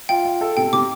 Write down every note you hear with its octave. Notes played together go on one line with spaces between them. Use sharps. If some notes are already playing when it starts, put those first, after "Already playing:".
F4 G5
F4
A4
C3 G5
C3 D6